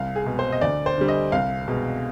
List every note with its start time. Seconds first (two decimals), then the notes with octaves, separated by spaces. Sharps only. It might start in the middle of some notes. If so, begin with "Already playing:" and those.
Already playing: C2 F5
0.16 G#4
0.26 B2 G#3
0.39 C5
0.52 D#5
0.61 D2 D5
0.86 C5
0.98 D3 G3
1.08 D#5
1.32 C2 F5
1.68 B2 G#3